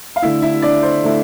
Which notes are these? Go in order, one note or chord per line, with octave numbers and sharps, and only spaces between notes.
F5
D3 A3 E4 E5
E4 E5
D4 D5
C5
D3 A3 E4